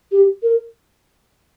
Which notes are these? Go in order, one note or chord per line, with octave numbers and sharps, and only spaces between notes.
G4
A#4